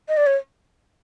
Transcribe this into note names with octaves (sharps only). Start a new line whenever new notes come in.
D#5
D5
C#5